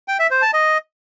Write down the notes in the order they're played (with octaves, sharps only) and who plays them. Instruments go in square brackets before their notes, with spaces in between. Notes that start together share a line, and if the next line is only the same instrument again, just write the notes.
[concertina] G5
E5
C5
A5
D#5